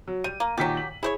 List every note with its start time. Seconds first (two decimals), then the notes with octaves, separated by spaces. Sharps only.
0.08 F#3
0.24 G3 D#7
0.40 A#3
0.58 A#2 D#3 F#3 G4 B6
0.77 F#7
1.03 E4 G#4 C5 C#5